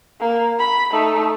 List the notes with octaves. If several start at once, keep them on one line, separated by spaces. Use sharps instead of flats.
A#3
B5
A3 D#4